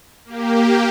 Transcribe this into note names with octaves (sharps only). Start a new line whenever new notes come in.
A#3 G4